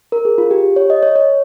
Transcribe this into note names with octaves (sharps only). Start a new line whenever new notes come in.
A#4
G#4
F4
G4
C#5
D#5
C#5
C#5